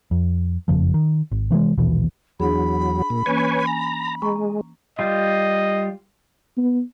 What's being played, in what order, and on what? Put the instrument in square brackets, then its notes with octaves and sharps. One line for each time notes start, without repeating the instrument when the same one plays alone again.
[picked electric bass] F2
F#1 F2 C#3 F3
D#3
G#1
C3 E3 F#3 G#3
A#1 D#2 B2 E3
[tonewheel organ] E2 F#3 [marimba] D4 G#4 [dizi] B5
[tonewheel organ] A#2
[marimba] E3 A#3 C#4 [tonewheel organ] B4 C#5 G#5
[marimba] G#5 [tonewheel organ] A#5
[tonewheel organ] G#3 [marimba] A#5 C#6
[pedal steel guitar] G3 F4 [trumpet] D#5
[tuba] B3